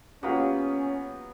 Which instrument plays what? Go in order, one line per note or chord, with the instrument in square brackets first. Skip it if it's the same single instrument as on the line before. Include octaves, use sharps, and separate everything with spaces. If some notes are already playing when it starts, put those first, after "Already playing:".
[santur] F#3 B3 [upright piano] A#3 F4 G4 [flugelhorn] C#4